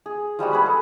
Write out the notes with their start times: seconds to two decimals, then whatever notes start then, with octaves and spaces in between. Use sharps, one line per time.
0.06 G#4
0.39 F3 G3 G#3 F#4
0.51 G#4 B4 B5
0.66 A4